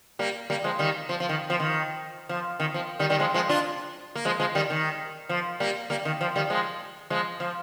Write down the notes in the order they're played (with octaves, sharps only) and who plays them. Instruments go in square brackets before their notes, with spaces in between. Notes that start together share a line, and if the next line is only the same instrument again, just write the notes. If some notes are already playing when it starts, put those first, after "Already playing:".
[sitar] G3 A#3
G3 A#3
F3 G#3
D#3 G3
F3
F3
D#3
F3
D#3
F3
D#3
F3
D#3 G3
D#3 G3
F3 G#3
F3 G#3
D4 F4
A#3
F3 G#3
F3 G#3
D#3 G3
D#3
F3
G3 A#3
G3 A#3
D#3
F3
D#3 G3
F3 G#3
F3 G#3
F3